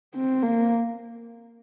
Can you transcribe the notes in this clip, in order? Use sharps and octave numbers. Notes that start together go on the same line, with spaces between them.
C4
A#3